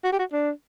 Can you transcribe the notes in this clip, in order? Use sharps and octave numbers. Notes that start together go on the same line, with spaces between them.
F#4
G4
F#4
D4